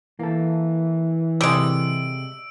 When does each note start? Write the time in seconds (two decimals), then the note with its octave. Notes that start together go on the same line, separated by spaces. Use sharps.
0.19 E3 A#3 A4
1.41 C3 G3 G#3 A4 E6 D7